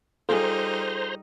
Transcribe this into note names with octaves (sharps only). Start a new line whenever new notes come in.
G3 D#4 F4 G#4 A4 C5 A#5 C6